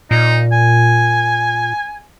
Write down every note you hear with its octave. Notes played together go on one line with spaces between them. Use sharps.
A#2 D#4
G#5